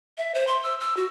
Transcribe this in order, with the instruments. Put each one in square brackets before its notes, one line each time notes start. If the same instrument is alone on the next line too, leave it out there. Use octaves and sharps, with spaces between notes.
[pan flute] E5
C5
C6
E6
E6
F#4